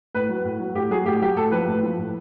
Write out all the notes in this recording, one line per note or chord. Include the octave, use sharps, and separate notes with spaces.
A2 B4
F#3
A2
F#3
A2 G4
F#3 G#4
A2 G4
F#3 G4
A2 A4
F3 B4
A2
F3
A2